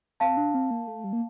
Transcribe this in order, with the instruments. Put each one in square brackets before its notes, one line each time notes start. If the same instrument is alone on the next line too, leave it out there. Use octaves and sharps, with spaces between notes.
[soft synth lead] C4 [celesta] F5 A5
[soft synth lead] D4
C4
A#3
A3
G3
A#3